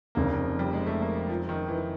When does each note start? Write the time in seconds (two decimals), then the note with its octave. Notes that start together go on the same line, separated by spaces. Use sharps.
0.15 F1 F2 C#3 A#3
0.59 G3
0.73 G#3
0.87 A3
1.01 A#3
1.30 F3
1.49 D#3
1.68 E3